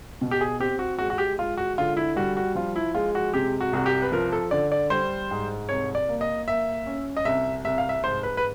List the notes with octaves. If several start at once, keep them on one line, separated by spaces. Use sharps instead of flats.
B2
G4
G#4
C4 G4
F#4
G#3 F#4
F#4
G4
G#3 F4
F#4
D3 F4
E4
G3 F#4
F#4
F3 F4
E4
G#3 F4
F#4
C3 G4
F#4
C2 F#4
G4
B4
F3 A#4
A4
D3 D5
D5
G3 C5
G#2
C2 C#5
D5
A#3
D#5
A#3 E5
C#4
D#5
C2 E5
C2 E5
F5
E5
G#2 C5
B4
B4